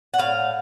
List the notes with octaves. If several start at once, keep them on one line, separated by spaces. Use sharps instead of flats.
F#5
A2 F5